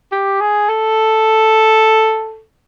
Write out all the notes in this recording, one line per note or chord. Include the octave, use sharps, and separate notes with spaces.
G4
G#4
A4